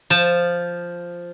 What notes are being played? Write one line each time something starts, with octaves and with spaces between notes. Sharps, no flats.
F3 A5